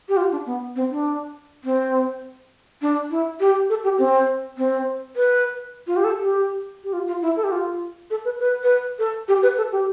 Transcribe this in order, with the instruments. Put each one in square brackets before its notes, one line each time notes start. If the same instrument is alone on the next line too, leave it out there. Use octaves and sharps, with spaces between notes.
[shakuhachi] G4
F4
D4
B3
C4
D4
C4
D4
E4
G4
A4
G4
C4
C4
B4
F4
G4
A4
G4
G4
F4
F4
E4
A4
G4
F4
A4
B4
B4
B4
A4
G4
B4
A4
G4